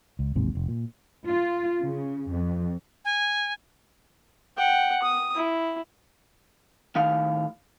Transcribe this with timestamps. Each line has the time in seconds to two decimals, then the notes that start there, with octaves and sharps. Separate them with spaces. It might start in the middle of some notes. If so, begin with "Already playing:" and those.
0.19 C#2
0.36 A1 D#2 G#2 C3
0.55 F1
0.68 A#2
1.25 F4
1.82 C#3
2.30 F2
3.05 G#5
4.58 F#5 G5
5.03 D#6
5.36 E4
6.95 A2 D#3 F5